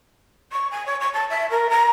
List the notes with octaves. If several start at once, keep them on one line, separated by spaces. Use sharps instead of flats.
C#6
G#5
C#5
C#6
A5
E5
A#4
A#5